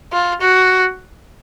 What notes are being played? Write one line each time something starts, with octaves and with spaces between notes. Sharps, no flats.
F4
F#4